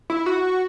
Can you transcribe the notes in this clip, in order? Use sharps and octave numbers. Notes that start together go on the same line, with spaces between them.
E4
F#4